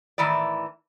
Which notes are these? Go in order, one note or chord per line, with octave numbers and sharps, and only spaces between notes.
A2 D#3 E3 E4 D5